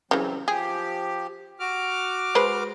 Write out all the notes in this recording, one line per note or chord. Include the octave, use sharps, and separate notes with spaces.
C#3 E3 F#3 G3 C4
F3 G4 G#4
F#4 D6 F6
G#3 B4 C5